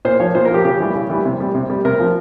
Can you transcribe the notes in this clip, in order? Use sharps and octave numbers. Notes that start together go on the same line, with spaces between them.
A#2 C5
F3 C#5
A#2 C5
A#4
F3 G4
C#3 G4
E3 G3
C#3
E3 G3
C3
G3
C3
G3
C3 A#4
F3